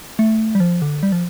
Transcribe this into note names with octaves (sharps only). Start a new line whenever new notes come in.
A3
G3
F3
D3
G3
F3